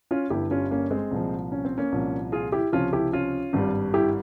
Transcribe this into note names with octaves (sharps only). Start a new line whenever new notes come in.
C#4 F4
G1 G2 G3 E4 G4
C#4 F4
A#3 C#4
G#3 C4
C2 A#2 F3
C#4
C4
A#3 C#4
C2 A#2 F3
F4 G#4
E4 G4
C#2 C3 F3 C#4 F4
E4 G4
C#4 F4
G#1 G2 G3
E4 G4